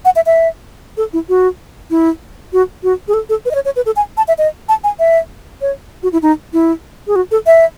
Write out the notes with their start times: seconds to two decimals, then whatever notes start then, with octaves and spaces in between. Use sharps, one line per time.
0.05 F#5
0.16 E5
0.26 E5
0.97 A4
1.13 E4
1.29 F#4
1.90 E4
2.53 F#4
2.83 F#4
3.08 G#4
3.14 A4
3.29 A4
3.45 B4
3.51 D#5
3.55 C#5
3.65 C#5
3.76 B4
3.86 A4
3.96 G#5
4.17 A5
4.28 E5
4.38 D#5
4.69 A5
4.84 G#5
4.99 E5
5.61 C#5
6.03 F#4
6.12 E4
6.22 D#4
6.53 E4
7.07 G#4
7.16 F#4
7.31 A4
7.46 E5